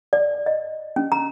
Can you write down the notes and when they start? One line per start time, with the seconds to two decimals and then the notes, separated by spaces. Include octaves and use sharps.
0.13 D5
0.46 D#5
0.96 C#4
1.12 A#5